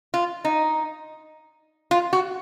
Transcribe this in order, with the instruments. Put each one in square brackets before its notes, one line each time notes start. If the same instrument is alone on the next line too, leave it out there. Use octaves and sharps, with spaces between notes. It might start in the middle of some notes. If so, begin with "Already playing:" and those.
[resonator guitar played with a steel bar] F4
D#4
F4
F#4